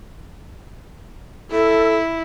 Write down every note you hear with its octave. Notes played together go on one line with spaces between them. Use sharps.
E4 A4